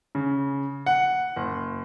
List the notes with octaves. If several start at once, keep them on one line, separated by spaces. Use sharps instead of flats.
C#3
F#5
F#1